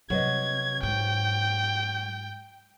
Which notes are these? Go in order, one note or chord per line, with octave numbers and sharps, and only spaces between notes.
C3 F#3 B4 D#5 G#6
G#2 G5